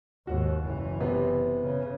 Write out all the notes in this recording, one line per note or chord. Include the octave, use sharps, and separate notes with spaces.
D#2 G#2 F#4
F#1 E3
C3 B3
C#3